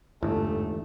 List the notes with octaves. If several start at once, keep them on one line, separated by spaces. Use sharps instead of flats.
G1 E2 G#2 A3 E4